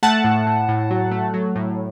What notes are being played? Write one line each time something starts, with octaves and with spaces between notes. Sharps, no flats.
A3 F#5 A5
A2
A2
A2
F#3
A3
F#3
A2